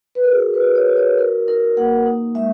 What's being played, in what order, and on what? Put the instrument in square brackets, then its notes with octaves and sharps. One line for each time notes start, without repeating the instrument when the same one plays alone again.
[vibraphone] B4
A#4
F#4 G#4
B4
F#4
C#5
F#4
C#5
D#4 A#4
D#4 A#4
A#3 F#5
D#4
G#3 E5